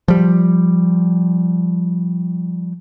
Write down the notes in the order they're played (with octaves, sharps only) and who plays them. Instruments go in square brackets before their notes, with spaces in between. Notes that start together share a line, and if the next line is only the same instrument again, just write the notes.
[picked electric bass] F3 G3